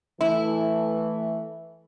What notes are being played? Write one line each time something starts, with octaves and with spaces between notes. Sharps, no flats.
E3 A3 E4